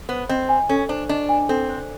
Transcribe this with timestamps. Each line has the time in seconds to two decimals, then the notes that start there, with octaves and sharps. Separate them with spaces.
0.09 B3 C5
0.29 C4 D#5
0.49 G#5
0.69 C#4 A4
0.89 D4 C5
1.09 D4 D#5
1.29 G#5
1.49 C4 A4
1.69 C5